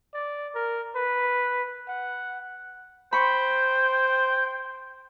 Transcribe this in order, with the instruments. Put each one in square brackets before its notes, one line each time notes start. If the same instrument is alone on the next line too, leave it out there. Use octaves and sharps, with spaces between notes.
[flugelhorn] D5
A#4
B4
F#5
[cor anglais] C5 [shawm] G5 [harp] B5 C#6